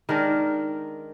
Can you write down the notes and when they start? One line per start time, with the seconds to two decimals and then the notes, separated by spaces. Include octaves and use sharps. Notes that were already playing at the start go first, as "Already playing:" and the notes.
0.09 D#3 G#3 D4 A#4